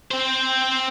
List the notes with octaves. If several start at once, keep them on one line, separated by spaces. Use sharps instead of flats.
C4 C5